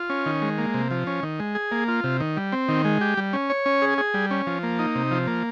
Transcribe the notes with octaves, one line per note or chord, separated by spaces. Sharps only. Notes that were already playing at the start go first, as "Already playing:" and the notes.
Already playing: F4
C#4
D#3
G#3
A#3
C3
F3
C#4
D#3
G#3
G#4
A#3
F4
C3
D#3
G3
C4
D#3
G#3
G4
G3
C#4
C#5
C#4
G#4
G#4
G3
C#4
F3
A#3
D#4
C3
F3
A#3